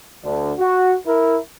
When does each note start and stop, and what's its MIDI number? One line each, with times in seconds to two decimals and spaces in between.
0.24 0.53 38
0.24 0.53 50
0.59 0.95 66
1.07 1.39 64
1.07 1.39 70